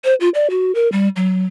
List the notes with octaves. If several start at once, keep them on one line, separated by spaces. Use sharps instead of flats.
C5
F4
D5
F#4
A#4
G3
F#3